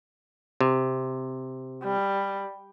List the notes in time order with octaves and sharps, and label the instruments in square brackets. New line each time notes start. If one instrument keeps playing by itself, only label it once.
[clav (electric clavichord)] C3
[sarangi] G3